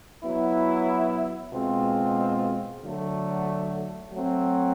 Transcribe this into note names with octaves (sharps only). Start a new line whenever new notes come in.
F#3 B3 E4
B2 G#3 C4 F4
D3 F#3 A3
F#3 A3 C4